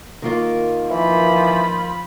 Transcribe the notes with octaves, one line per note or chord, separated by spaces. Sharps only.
D#3 A#3 F4
E3 F3 B5